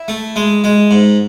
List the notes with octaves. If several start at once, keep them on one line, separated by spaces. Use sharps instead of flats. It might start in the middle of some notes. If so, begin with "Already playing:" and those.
Already playing: E4
A3
G#3
G#3
G#2